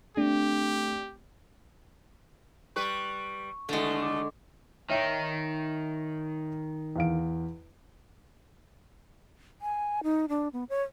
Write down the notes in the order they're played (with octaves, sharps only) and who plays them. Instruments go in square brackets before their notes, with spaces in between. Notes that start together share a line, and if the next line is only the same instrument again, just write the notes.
[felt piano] A3 C4 [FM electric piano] D4 [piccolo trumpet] G4
[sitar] G3 B4 [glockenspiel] C#6
[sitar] D#2 B2 A3 [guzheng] D3 G#3
[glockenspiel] D6
[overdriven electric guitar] D#3 D#4 [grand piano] C#5 E5 G5
[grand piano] E2 F5 D7
[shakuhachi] G#5
D#4
D4
B3
C#5